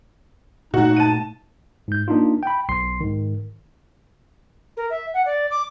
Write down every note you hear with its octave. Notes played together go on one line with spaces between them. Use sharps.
A#2 A3 D#4 F#4 F#5
A5 D#7
G#2 G6
A#3 D4 D#4 F4
G5 B5
B1 C6 C7
G#2 D#3
A#4
E5
F#5
D5
D6